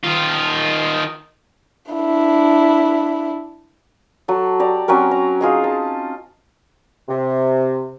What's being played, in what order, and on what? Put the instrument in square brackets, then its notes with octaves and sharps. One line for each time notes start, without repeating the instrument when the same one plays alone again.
[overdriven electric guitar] D#3 F4
[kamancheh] D4 E4
[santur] F#3 A4
G4 D5 A#5
F#3 C4 C#4 A#4
A#5
D#4 F4 G#4 D#5
A5
[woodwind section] C3